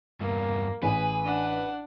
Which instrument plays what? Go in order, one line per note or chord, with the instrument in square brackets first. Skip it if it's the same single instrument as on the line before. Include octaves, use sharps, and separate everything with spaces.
[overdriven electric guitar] E2 G2 [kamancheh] A#3
[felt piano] A1 [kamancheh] G#4 [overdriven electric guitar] B4 [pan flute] G#5
[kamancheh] D4 F#5